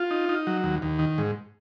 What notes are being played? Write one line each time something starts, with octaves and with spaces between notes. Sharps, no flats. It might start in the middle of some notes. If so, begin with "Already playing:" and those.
Already playing: F4
D#4
D#4
F#3
D#2
D#2
D#3
G#2